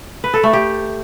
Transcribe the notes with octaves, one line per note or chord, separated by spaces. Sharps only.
B4
A4
A3
G4